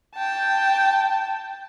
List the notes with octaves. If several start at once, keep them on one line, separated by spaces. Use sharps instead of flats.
G5 A5